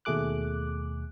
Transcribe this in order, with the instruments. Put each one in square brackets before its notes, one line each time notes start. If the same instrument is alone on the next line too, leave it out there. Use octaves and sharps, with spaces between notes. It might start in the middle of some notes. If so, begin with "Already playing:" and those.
[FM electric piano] D#2 B2 A3 G#4 D6 F#6